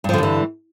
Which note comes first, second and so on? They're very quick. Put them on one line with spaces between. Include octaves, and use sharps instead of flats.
G2 F3 D3 G3 E3